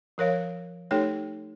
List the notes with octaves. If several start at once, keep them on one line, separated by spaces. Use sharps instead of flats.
F3 A#4 C#5 F5
A3 D#4 G4 A4 C#5 G5